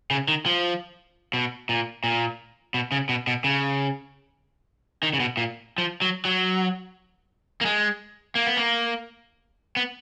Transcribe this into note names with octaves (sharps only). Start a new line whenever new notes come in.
C#3
D#3
F3
B2
A#2
A#2
B2
C#3
B2
B2
C#3
D#3
C#3
B2
A#2
F3
F#3
F#3
A#3
G#3
A#3
B3
A#3
B3